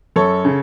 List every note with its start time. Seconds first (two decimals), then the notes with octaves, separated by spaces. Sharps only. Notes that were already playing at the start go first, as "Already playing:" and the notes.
0.16 F#2 A4 C#5
0.45 C#3